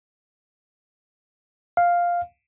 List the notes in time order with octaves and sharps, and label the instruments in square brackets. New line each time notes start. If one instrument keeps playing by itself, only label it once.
[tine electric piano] F5